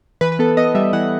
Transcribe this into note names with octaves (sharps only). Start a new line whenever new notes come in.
E3 B4
B4
B3 A4
B3 D#5
G3 E5
E3 F#5